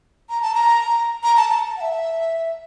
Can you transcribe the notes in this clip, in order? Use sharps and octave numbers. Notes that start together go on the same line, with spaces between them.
A#5
A5
A#5
A#5
A5
A5
F#5
E5